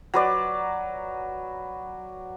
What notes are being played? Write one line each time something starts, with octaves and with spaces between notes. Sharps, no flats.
F#3 B4 D5